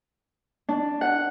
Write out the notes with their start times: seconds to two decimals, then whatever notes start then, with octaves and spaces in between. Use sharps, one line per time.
0.69 D4
1.01 F#5